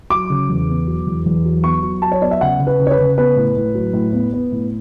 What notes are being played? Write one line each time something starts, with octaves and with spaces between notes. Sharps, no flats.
F#3 D6
C#3
E2
B3
F#3
E2
E2
F#3
B3 C#6
F#3
F#3 A5
C#5
B3 D5
E5
C#3 F#5
C#3
B4
C#3
C#5
B4
C#3
B3 B4
A2
A2
F#3
A2
B3
B3
A2